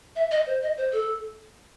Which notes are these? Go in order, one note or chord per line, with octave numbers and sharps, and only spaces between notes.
E5
D#5
C5
D#5
C5
A4